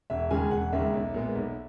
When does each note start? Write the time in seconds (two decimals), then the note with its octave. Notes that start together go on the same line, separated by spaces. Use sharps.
0.10 E1 E5
0.30 D#2 C#3 G#3 G#5
0.51 E1 F#5
0.72 D#2 C#3 G#3 E5
0.94 B1
1.14 A#2 G#3 B3
1.35 B1